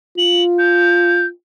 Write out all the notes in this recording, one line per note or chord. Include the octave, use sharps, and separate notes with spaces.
F4 F#7
G6